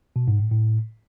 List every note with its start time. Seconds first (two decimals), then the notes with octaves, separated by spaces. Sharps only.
0.16 B2
0.28 G#2
0.40 A2
0.51 A2